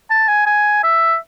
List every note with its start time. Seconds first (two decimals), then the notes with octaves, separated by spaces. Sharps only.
0.10 A5
0.28 G#5
0.46 G#5
0.83 E5